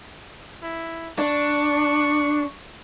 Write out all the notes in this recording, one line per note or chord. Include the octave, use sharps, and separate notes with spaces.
E4
D4 C#6